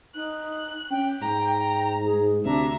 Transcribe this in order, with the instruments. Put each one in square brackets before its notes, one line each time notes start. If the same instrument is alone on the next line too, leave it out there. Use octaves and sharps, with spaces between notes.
[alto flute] D#4 [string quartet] F#6
[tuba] C#4 [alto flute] G5
[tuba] G#2 [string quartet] A#5
[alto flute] G#4
[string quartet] D2 E5 A#5 [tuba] C3 [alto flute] D4